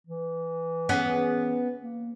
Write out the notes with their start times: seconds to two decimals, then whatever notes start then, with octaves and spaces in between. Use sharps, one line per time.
0.07 E3
0.89 B3 C#4 G#4
1.82 A#3